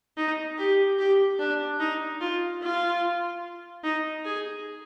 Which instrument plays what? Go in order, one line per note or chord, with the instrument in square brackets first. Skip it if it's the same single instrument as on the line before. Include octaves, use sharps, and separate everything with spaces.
[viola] D#4
G4
G4
D4
D#4
F4
F4
D#4
G#4